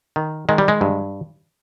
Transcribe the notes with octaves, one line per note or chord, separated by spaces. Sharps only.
D#3
D#3 G#3
G3
G#3
G2